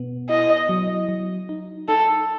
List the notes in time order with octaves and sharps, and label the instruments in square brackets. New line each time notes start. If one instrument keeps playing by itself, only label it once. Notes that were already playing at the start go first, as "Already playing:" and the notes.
Already playing: [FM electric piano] B2 B3
[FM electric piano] E4 [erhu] D#5
[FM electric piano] F#3
F#3
D#4
[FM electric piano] D#4 [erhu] A4